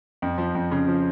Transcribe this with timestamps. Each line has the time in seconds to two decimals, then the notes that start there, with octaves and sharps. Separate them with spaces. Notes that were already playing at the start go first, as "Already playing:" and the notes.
0.22 F2
0.38 F3
0.55 F2
0.71 C#3
0.88 F3